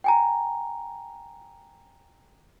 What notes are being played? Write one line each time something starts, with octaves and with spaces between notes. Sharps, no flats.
G5 G#5 A#5